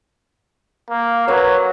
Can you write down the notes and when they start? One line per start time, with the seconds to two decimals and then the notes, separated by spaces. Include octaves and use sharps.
0.90 A#3
1.28 F#3 A#4 B4 C#5